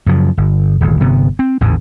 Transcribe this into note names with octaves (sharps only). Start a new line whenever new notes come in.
F#2 C#3 F3
G1
D#1 G#1 D2
G1 C3 B3
C4
A1 E2 G#2 D3